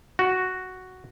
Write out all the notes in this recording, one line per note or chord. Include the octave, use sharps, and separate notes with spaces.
F#4